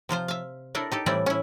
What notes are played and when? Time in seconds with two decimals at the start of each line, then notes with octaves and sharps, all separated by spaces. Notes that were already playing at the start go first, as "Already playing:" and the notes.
0.09 C3 F3 F4 C5
0.28 E5 F5
0.75 D4 E4 A4 A#4
0.92 D#4 G4 A4
1.06 A2 E3 G3 C4 E4 D5
1.26 C#4 E4